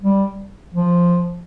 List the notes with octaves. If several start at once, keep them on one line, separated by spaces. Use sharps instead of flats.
G3
F3